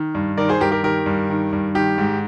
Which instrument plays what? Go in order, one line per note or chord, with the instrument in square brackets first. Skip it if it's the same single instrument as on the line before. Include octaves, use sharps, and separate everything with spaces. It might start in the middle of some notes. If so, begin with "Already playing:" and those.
Already playing: [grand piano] D#3
G2
D#3 A#4 D5
G#4 C5
G2 G4 A#4
G4 A#4
D#3 G4 A#4
G2
D#3
G2
D#3 G4
G#2